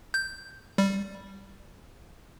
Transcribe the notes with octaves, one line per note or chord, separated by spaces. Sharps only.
G6
G3